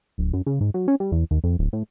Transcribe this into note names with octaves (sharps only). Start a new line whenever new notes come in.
D1
F#2
C#3
G#2
F#3
C#4
G3
E2
D#2
F2
D1
A2